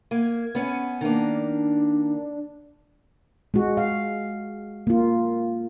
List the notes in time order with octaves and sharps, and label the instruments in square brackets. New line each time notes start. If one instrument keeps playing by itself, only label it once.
[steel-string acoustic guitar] A#3 [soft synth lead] G#6
[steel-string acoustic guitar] B3 C#4
[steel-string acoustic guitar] D#3 A#3 [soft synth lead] D4
[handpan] G#3 F#4
F5
A#3 F4